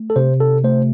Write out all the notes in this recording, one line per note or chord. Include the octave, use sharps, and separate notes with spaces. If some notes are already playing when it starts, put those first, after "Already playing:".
Already playing: A3
A4
C3 C5
A4
A3 C5